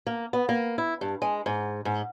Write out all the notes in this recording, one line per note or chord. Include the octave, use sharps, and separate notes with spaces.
A#3
B3
A#3
E4
G2
G#3
G#2
G#2